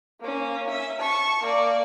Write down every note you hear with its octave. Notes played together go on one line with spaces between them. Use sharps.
A#3 C#4
C#4 E5
A5 C#6
A#3 D5